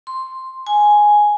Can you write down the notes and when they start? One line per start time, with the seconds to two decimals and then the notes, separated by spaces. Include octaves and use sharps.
0.07 C6
0.67 G#5